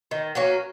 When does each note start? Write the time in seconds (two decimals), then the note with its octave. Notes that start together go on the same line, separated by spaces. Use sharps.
0.11 D#3
0.35 F#3 A#3 C#4